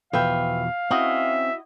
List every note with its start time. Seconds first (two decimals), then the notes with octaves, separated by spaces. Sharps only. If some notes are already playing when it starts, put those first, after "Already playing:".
0.13 E2 B2 F3 B4 E5 F5 G5
0.91 C4 C#4 E4 F#4 D#5 E5